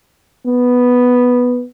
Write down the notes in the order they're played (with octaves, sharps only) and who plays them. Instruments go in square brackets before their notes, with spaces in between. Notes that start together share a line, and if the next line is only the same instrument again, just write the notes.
[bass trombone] B3